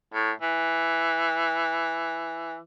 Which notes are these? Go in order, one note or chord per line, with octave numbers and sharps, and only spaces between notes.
A2
E3